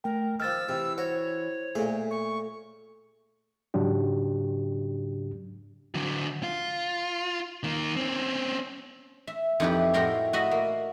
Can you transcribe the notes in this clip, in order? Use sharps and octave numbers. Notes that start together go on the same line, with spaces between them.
A3 A#4 G5
D#3 F3 E6 F6 A6
C3 E3
F#4 C5 C#5
A#2 A3 G#4
C#6
G#2 C#3 F#3 D4 G4
D3 F#3
F4
D#3 A#3
C4 C#4
E5
F2 D#4 E4 G4 B4
A2 F#4 A#4 G5 A#5 C6
F#4 D#5 E5 B5
A#3